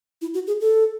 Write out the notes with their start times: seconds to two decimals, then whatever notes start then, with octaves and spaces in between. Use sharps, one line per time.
0.22 E4
0.34 F#4
0.47 G#4
0.61 A4